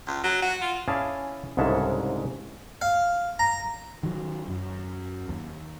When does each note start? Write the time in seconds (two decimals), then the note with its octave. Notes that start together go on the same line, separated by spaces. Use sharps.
0.07 C#2
0.24 F#3
0.42 F#4
0.62 F4
0.88 C#4 E4 G#4 D5 F5 A5
1.57 C2 G#2 C#3 G#3 A4 E5
2.82 F5
3.39 A#5
4.03 D#3 F#3
4.48 F#2
5.29 D#2